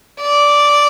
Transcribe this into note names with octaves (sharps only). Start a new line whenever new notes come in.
D5